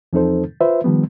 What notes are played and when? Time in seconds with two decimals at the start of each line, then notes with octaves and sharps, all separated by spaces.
0.13 E2 F3 C4 D#4 A4 C5
0.61 F4 B4 C5 E5
0.84 D#3 F3 G3 B3